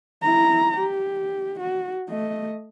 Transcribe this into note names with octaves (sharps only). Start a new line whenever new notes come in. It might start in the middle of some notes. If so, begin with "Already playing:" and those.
E4 A#5
G4
F#4
A3 D#5